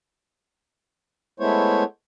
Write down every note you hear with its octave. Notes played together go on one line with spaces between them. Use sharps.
G#3 A3 B3 E4 C5 C#5